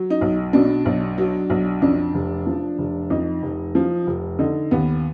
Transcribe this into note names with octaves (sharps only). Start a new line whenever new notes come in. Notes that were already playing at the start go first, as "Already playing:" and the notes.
Already playing: F#3
D#4
B1
B2 D4
B1
F#3
B1
F2 D4
F1
F3
F1
F2 D#4
F1
F3
F1
D3 D#4
D#2 B3